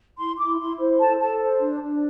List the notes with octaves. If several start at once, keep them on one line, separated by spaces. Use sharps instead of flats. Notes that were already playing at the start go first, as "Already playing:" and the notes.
E4 C6
E4 D6
E4 C6
C5
A4 A5
A4 A5
C5
D4
D4